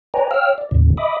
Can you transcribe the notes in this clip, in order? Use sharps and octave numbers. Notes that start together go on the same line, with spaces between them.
B4 C#5 D5 G5 G#5 A#5
C#5 F5 G5 E6 F6
D5
D#2 A2 C#3
D#5 E5 B5 D6 D#6